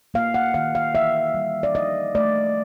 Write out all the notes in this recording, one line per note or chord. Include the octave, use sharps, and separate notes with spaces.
A#3 F5
F#5
D#3 F5
F5
E3 E5
G3
D5
F3 D#5
A3 D5